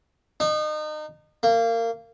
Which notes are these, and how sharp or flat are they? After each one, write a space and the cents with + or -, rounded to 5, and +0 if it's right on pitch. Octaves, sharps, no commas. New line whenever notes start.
D#4 -30
A#3 -25